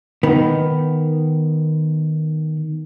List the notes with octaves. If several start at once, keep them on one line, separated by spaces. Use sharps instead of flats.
D#3 B3